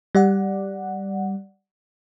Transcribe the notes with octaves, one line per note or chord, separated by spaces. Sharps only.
G3 D5 F#5